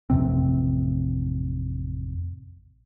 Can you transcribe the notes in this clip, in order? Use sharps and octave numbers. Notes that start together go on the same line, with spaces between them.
A1 F2 C3 C4